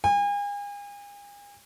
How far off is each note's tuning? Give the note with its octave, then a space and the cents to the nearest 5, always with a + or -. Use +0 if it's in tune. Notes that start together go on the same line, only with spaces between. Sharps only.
G#5 -40